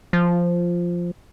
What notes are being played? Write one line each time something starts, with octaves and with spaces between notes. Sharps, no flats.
F3